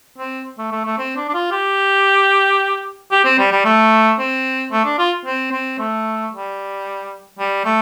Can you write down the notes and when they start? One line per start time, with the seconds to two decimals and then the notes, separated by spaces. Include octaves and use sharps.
0.18 C4
0.58 A3
0.71 A3
0.85 A3
0.98 C4
1.16 D4
1.28 D4
1.34 F4
1.51 G4
3.12 G4
3.25 C4
3.39 G3
3.52 G3
3.65 A3
4.19 C4
4.72 A3
4.85 D4
4.99 F4
5.25 C4
5.52 C4
5.79 A3
6.32 G3
7.38 G3
7.65 A3